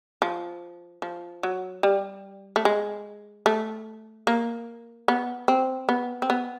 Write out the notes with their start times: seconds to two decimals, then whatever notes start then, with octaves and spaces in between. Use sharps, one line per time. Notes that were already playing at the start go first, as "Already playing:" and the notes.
0.22 F3
1.02 F3
1.43 F#3
1.83 G3
2.56 A3
2.65 G#3
3.46 A3
4.27 A#3
5.08 B3
5.48 C4
5.89 B3
6.22 C4
6.30 B3